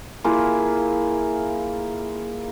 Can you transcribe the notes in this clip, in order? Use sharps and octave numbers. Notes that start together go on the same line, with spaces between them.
A#3 E4 F4 G#4